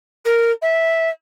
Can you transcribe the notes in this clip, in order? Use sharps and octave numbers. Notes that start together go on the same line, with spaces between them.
A#4
E5